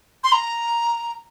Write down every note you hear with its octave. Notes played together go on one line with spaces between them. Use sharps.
C6
A#5